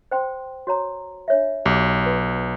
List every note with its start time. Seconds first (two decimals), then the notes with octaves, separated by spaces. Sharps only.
0.11 C5 G5 C6
0.67 F#4 C#5 A#5
1.28 D4 C#5 E5
1.66 B1 G4 D6
2.06 B4